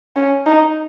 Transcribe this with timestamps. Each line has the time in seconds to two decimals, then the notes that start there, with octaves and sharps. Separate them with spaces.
0.16 C#4
0.46 D#4